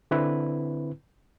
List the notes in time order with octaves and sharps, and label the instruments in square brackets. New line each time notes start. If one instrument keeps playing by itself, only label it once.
[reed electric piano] D3 C4 E4 B4